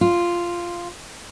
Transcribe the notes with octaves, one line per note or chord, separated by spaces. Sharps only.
F4